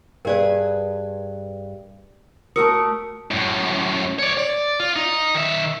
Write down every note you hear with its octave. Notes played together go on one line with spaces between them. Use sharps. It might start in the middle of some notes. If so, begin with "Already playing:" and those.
G2 G#4 A#4 B4 D5
A3 F#4 A#4 D#6 E6 C#7
F#2 A2
C#5 D5
D5
F4
D#4
D#3 E5